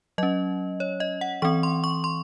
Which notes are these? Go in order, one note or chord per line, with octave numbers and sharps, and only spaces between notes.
F#3 C#4 D#5
C#5
D#5
F#5
E3 C4 C#6
C6
C#6
C6